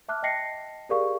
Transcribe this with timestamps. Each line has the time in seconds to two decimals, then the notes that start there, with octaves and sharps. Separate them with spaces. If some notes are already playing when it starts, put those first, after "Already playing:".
0.09 E5 A5 D6 F6 F#6
0.23 D#5 G5 A5 A#6 C7 C#7
0.89 G4 G#4 A#4 D5 F5 C#6